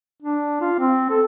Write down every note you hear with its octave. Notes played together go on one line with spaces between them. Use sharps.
D4
F4
C4
A4